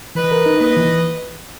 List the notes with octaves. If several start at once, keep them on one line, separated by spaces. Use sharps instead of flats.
E3 B4 D#5
A#4
D#4
A#3 B4 D#5
E3